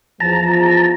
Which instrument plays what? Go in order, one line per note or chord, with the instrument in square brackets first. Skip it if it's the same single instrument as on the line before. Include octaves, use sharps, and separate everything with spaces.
[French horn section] E2 F3 [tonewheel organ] A5 A#5